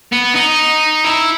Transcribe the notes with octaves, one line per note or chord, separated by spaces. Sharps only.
B3
D#4
E4